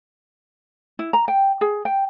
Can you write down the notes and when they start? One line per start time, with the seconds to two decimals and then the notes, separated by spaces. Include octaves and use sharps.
0.99 E4
1.13 A#5
1.28 G5
1.61 G#4
1.85 G5